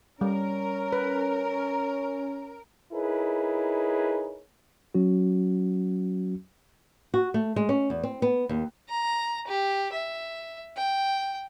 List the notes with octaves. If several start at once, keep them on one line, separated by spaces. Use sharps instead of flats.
G3 C#4 A#4
B4
D#4 E4 G#4 A#4 B4 C#5
F#3 C#4 F#4
F#4
A3
G#3
C#4
E2
C4
B3
D#2
A#5
G4
E5
G5